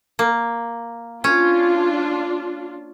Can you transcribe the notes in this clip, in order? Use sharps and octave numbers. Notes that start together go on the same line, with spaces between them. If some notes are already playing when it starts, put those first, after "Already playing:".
A#3
C#4 D4 F4